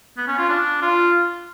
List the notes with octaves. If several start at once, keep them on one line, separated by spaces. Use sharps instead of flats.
B3
C#4
F4
D4
F4